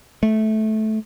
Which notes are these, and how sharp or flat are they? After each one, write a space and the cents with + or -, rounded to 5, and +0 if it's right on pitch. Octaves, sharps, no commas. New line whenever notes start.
A3 -15